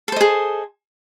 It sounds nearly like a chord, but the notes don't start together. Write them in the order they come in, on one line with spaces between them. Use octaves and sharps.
A4 C5 D#5 G#4